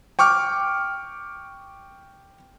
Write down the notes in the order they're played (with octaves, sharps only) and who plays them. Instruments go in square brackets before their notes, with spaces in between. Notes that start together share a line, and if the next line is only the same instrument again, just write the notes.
[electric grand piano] G5 C#6 D6 F6